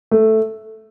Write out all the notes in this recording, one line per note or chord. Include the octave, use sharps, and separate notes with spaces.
A3